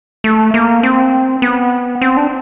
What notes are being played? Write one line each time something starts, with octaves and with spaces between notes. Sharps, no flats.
A3
A#3
C4
B3
C4
D4